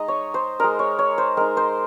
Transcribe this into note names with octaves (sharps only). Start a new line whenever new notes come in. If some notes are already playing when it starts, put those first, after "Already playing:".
Already playing: G#3 D#4 D#5
C#5
C5
G#3 D#4 A#4
C#5
C#5
C5
G#3 D#4 A#4
C5